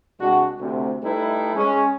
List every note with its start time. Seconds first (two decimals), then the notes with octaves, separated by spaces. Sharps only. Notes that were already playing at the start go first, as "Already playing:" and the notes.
0.20 C2 G#3 D4 F#4
0.59 D2 C3
1.03 G3 A3 D#4 E4 A4 B4
1.55 G#3 C#4